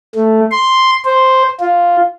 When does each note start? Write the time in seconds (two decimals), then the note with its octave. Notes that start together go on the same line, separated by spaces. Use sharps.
0.15 A3
0.51 C6
1.05 C5
1.60 F4